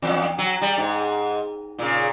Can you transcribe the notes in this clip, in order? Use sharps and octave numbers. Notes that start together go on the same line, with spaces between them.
E2
F#3
G3
G#2
A#2 C#3